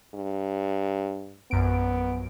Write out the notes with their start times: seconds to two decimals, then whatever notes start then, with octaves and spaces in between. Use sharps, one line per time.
0.14 G2
1.51 A#1 F#2 B3 D7